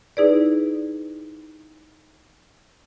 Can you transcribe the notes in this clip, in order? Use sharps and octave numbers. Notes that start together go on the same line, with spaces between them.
D#4 E4 G#4 B4 D5